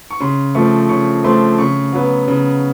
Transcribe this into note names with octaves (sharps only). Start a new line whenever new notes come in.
C#6
C#3 C6
F3 A3 C4 C#6
C#3 C#6
F3 A3 C4 C6
C#3 C#6
F#3 B3
C#3